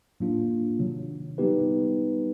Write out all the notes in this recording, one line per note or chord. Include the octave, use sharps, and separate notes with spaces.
A2 F#3 A#3 D4 F4
C3 D#3 F#3
G3 B3 D#4 G4 B4